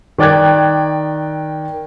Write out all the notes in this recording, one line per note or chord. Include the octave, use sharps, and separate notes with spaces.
D#3 D5 G5 F#6 G#6